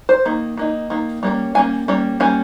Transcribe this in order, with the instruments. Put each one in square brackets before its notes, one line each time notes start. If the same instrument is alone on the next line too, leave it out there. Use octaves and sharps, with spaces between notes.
[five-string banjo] C5
D#3 A#3
D#3 A#3 D#4
D#3 A#3
G3 A#3 C#4
G3 A#3 C#4 G#5
G3 A#3 C#4
G3 A#3 C#4 G#5